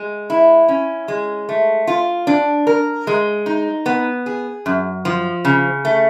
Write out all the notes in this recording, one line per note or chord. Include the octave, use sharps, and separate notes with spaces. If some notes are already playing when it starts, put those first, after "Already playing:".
Already playing: G#3
E4
C#4
G#3
A3
F4
D4
A#4
G#3
D#4
B3
G#4
F#2
F3
C#3
A3